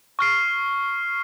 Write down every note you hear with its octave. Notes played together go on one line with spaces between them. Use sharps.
C#6 F6 C7